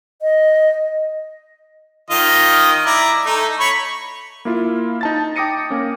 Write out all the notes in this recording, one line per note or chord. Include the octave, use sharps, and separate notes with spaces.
D#5
D#3 F4 D#5
E4 D5 A#5
A3 D#4
C#5 B5 C#6
A#3 E4 F4
D#4 A5 A6
G5 D6 D#6 A#6 C#7 D#7
A#3 C#4